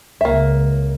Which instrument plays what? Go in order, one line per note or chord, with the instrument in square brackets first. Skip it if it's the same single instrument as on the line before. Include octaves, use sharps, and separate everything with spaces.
[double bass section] C#2 [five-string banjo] A#3 E5